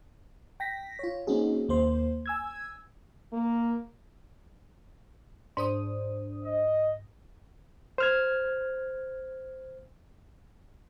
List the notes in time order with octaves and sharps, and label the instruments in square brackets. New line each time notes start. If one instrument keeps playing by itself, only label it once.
[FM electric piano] G5 A#6 B6
F4 C#5
A#3 C4 C#4 D#4 F#4 G#4
D#2 A#3 C5 C6
G#5 E6 G#6
[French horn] A#3
[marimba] G#2 [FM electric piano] D4 C5 D#6
[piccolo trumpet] D#5
[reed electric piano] C5 F6 G#6